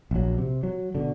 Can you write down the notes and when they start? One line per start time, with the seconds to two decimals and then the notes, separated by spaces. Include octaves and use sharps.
0.11 A#1 F#3
0.38 C3
0.63 F#3
0.95 B2 D3